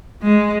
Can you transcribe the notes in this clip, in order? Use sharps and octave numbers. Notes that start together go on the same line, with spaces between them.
G#3